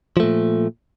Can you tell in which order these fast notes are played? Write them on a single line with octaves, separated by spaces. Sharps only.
F3 A3 A#2